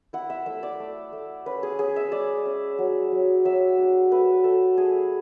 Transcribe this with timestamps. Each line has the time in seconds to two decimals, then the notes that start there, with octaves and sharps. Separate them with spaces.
0.13 E4 F#5
0.30 E5
0.46 A3 E5
0.63 D5
0.80 A3
1.13 A3
1.46 C#4 B4
1.63 G#4
1.79 C#4 G#4
1.96 E5
2.12 G#3 D5
2.45 C#4
2.78 F#3
3.12 F#3
3.45 F#3 E5
3.78 D4
4.11 A3 B4
4.44 A3 A4
4.78 A3 G#4